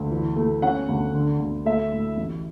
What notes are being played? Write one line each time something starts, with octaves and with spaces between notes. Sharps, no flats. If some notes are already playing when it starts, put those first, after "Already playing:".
Already playing: D2
E3
A3
C#4 F#5
D2
D3
D2
A3 E5
A2
A1